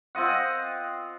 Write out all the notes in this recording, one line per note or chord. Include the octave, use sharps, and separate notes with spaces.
C4 F4 D#5 F#5